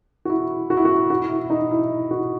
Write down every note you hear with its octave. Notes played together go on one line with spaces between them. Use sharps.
F#4
E4
F#4
E4
F#4
F#4
E4
D#4
E4
F#4